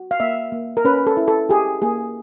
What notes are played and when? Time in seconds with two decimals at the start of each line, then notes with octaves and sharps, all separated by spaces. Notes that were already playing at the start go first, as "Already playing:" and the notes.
Already playing: F#4
0.11 F5
0.20 A#3 E5
0.52 A#3
0.77 A#4
0.85 C#4 B4
1.07 A4
1.17 E4
1.28 A4
1.49 G4 G#4
1.82 A#3 G#4